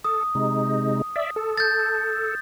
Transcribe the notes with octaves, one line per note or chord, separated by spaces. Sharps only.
A4 D#6
C3 G#3 D#4
D5 E5
A4
G6 A6